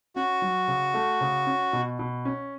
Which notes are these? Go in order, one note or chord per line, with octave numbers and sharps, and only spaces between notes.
C#4 F#4
F#3
C#3
A3
C#3
C#4
B2
B2
C#4